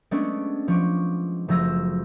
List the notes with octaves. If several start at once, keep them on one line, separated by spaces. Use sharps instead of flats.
G#3 A3 B3 C#4 D4
F3 C#6 D6
F#1 F3 A3 E6 A#6